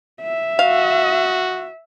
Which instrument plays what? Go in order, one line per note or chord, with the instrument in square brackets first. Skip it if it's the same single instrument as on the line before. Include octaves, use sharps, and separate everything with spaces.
[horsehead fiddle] E5
[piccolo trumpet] F#4 [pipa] F5